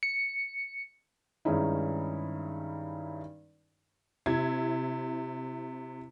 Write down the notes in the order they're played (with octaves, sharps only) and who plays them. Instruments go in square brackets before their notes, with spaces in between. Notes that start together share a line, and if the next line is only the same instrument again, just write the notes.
[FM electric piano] C#7
[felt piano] G2 D#3 G#3 C#4 D#4 E4
[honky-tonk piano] C3 E4 G#6